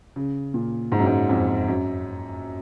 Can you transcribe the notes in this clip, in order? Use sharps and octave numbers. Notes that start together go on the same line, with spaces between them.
C#3
A#2
G#2
F#2
G#2
F2
F#2